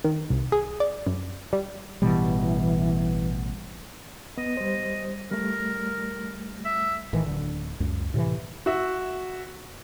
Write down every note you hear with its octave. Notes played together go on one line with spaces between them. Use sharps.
D#3
C2
G#4
D5
F#2
G3
A1 B2 E3 G3
B3 D#5
G3 C5
G3 A3 A#4
E5
A1 A2 D#3 E3
D1 D3
C#2 F#2
A2 C3 D#3 E3
F#4 E5